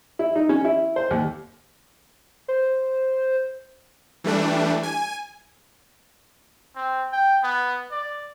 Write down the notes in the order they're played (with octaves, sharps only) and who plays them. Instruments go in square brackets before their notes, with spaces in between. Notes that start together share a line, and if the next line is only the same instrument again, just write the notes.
[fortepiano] E4
D#4
C#4
E4
C5
D#2
[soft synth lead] C5
[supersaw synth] E3 G3 A3 D4
G#5
[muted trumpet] C4
G5
B3
D5